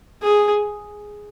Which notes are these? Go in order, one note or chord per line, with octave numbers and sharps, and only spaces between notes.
G#4